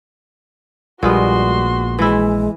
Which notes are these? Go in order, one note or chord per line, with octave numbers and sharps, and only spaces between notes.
A#1 A#2 G3 G#3 B3 F#4 C6
E3 G#3 E4